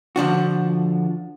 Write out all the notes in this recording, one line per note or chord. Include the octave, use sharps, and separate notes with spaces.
D3 F3 D4 F#4